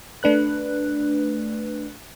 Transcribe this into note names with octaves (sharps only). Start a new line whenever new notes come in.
A3 D4 B4 F#6